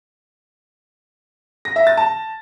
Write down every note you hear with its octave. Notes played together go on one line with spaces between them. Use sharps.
A#6
E5
A6
A5